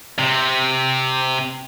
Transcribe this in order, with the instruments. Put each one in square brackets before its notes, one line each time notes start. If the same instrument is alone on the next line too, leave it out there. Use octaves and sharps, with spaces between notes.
[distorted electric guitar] C3